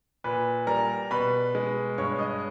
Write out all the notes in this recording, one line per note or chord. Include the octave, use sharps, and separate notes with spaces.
A#2 B4 B5
G3 A#4 A#5
B2 B4 B5
G#3
G2 C#5 C#6
D#5 D#6